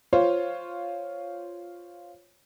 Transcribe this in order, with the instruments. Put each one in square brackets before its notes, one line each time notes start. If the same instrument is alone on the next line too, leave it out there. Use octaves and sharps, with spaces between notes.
[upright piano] F4 C5 C#5